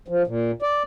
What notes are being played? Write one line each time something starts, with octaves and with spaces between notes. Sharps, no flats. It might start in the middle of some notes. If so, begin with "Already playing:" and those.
F3
A#2
D5